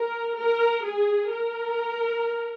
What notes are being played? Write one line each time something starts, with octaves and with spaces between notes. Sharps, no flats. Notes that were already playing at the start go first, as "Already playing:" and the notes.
Already playing: A#4
A#4
G#4
A#4